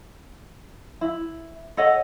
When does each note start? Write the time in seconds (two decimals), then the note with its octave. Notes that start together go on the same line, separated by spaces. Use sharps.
1.01 E4
1.77 A4 C#5 D#5 F#5